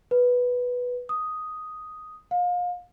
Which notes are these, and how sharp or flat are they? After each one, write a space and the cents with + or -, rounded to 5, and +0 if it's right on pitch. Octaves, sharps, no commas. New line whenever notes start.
B4 -5
D#6 +5
F5 +30